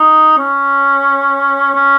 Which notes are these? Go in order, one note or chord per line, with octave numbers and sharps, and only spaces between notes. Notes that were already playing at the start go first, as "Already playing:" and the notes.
Already playing: D#4
C#4
C#4